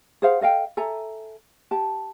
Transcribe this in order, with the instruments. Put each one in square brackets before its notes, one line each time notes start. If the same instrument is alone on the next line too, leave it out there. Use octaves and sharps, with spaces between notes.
[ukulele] G#4 C5 F5 F#5
A4 D#5 F5 G5
A4 E5 G#5 A#5
G4 A5